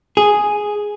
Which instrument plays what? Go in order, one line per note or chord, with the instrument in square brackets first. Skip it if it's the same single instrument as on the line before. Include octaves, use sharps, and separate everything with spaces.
[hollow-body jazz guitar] G#4